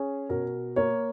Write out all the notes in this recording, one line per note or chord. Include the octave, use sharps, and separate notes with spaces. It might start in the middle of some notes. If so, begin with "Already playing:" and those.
Already playing: C#4 G#4
B2 A#4
A#3 C#5